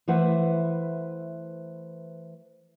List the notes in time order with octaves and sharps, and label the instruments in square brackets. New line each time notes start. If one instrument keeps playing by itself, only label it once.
[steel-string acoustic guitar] E3 A3 B4 C5 E5 F#5